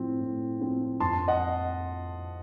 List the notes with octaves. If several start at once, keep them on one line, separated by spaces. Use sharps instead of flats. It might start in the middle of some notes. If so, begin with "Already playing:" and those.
Already playing: A2 F3 C4
A2
F3 C4
F2 A5 C6
D#5 F#5